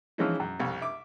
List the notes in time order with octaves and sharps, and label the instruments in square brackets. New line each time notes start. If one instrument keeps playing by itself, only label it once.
[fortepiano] E3 F3 G#3 C#4 D#4 E4
F#2
C2 F2
E5 D6